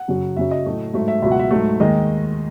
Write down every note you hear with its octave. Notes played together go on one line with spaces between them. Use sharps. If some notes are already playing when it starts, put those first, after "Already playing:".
Already playing: F#5
F#2 C#3 F#3
F#2 C#3 F#3 E5
D#5
A2 F#3 A3
G#2 F#3 A3 E5
E5
C#2 B2 F#3 E5
F#5
E5
G#2 F#3 A3
D#2 D#3 G#3 D#5